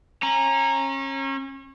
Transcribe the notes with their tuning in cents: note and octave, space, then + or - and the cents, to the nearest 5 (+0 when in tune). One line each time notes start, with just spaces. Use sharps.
C#4 -30 A#5 +0